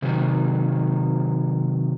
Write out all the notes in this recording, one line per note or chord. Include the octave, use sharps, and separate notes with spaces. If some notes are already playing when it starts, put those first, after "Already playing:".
C3 D#3 F#3